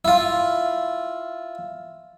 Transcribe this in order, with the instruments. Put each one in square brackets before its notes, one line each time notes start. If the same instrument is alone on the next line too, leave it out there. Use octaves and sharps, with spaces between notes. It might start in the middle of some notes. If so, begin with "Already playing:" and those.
[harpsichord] E4 F4